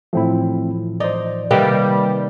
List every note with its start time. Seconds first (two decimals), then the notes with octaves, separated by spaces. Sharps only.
0.13 A2 E3 F3 A3 C4 E4
1.00 D#4 C5 D5
1.51 C3 D#3 G3 A#3 B4